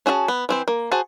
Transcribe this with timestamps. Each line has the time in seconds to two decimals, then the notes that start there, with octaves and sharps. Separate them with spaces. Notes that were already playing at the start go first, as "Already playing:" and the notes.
0.06 C#4 F#4 G#4 E5 A5
0.28 B3
0.49 E3 C4 C5
0.68 A#3
0.91 F#4 G#4 C5 A5